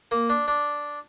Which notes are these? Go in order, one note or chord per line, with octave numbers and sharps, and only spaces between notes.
A#3
D4
D4